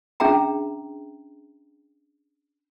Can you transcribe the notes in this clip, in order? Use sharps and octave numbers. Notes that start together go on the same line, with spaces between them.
C#4 D4 G#4 E5 G5 A#5